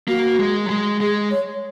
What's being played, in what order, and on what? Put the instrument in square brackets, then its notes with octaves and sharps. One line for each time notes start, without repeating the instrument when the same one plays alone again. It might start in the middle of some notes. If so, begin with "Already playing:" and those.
[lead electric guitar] A#3 [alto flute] F#4
[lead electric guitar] G#3
F#3
G#3
[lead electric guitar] G#3 [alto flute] G#4
[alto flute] C#5